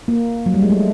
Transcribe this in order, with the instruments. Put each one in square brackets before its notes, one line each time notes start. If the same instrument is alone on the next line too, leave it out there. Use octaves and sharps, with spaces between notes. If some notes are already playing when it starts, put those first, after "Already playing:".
[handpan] A#3
F#3
G3
G#3
A3